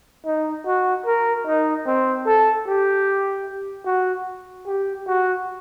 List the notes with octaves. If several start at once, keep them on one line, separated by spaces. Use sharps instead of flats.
D#4
F#4
A#4
D#4
C4
A4
G4
F#4
G4
F#4